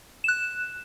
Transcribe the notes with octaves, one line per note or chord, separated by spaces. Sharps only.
F#6 E7